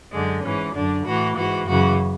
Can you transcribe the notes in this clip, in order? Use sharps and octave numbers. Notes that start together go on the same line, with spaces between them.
F#2 D3 G#3
G#2 E3 C#4
F#2 D3 D4
A2 E3 F#4
G#2 E3 F#4
F#2 C#3 E3 F#4